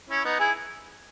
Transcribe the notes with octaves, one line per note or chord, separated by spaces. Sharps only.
C#4 E4
B3 D#4
E4 G#4